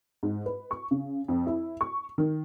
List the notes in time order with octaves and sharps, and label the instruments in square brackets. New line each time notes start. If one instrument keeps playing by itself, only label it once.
[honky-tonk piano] G#2
B4
C#6
C#3
F2
E4
C#6
D#3